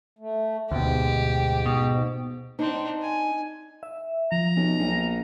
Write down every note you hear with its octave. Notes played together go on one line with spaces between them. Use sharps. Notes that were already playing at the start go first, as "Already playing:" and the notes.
A3
D2 G#2 B2 G4
B2
C4 D4 D#4
G#5
E5
F3 A#5
B1
A#1